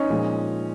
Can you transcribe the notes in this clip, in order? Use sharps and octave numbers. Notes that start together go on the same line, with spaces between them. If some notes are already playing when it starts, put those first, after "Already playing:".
Already playing: C#4 D#4
A#2 F3 G#3